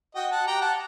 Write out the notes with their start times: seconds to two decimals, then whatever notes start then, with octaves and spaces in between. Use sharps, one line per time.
0.15 F#4 D#5 G5
0.31 F#5 A5
0.47 G4 G5 A#5
0.62 F#5 A5